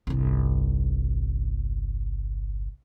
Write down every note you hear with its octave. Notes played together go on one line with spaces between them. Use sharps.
G1 C2